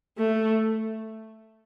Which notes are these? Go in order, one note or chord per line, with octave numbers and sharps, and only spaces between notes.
A3